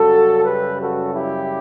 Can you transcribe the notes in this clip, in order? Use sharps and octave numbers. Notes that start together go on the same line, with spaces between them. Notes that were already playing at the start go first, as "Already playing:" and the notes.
Already playing: F#2 C#3 G3 F#4 A4
G4 B4
F#4 A4
E4 G4